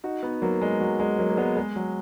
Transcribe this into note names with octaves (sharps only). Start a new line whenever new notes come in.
D#4 F#4
B3 D#4
F#3 A#3
G#3
F#3
G#3
F#3 A#3
A#3
G#3 B3
G#3
F#3